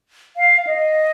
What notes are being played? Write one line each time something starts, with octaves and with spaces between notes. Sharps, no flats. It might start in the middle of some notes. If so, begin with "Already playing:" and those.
F5
D#5